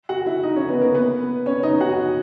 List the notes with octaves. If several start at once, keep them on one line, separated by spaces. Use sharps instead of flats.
F#4 F#5
E4 E5
D#4 D#5
C#4 C#5
B3 B4
A#3 A#4
B3 B4
C#4 C#5
D#4 D#5
F#4 F#5